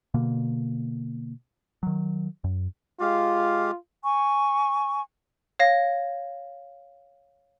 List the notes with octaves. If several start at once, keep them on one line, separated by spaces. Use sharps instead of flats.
B2 D3 A#3
D#3 F#3
F#2
G#3 F4 G4 F5
G#5 C#6
C#5 F5 A#6